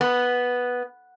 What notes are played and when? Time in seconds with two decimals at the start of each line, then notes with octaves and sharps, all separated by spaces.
0.01 B3